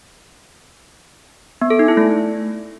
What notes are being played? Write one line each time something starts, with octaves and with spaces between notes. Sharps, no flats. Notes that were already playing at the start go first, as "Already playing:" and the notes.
B3
A4
D#4
E4
A3